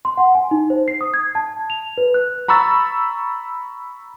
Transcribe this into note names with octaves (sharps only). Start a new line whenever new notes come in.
C6
F#5
G#5
D#4
C5
C7
D#6
G#6
A5
F7
B4
F#6
A#5 B5 C#6 E6 A6